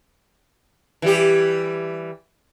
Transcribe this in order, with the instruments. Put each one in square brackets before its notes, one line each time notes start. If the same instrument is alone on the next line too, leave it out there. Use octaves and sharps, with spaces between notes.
[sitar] E3 G3 G4